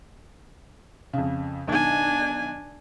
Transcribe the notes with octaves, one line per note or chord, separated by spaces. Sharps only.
F2 C#3
B1 D#3 D4 G#5 G#6